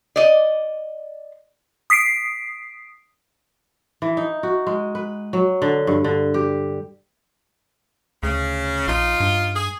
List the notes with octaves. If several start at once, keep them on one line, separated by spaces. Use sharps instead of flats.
D5 D#5
D#6 B6 C7 D7
E3
D#4
F#4
G#3
B4
F#3
D3
G2
D3
G4
D2 C#3
A#1 D#4 F4
G2
G#4